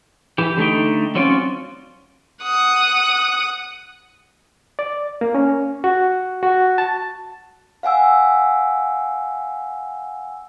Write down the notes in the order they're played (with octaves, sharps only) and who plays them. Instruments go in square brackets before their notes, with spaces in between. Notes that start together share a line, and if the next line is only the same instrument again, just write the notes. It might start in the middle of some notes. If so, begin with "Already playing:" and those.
[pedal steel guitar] E3 G4
D3 A3 D#4 G5
F#3 C4 C#4 F4 D5
[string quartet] F#5 D#6 F#6
[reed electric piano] D5
A#3
C#4
F#4
F#4
A5
[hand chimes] F5 F#5 G#5 E6